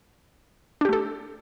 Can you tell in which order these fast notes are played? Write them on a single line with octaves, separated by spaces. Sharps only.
D4 G4 A3 A4